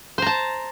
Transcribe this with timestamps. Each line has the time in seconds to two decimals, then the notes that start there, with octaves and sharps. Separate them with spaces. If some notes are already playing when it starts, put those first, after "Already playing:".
0.18 C5
0.22 A#5
0.27 A5